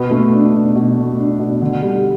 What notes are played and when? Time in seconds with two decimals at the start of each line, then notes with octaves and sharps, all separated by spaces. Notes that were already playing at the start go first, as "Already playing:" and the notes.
Already playing: B2 B4
0.11 A3
0.32 D4
0.54 B2
0.75 B2
0.97 A3
1.18 D4
1.39 B2
1.62 D3
1.82 G3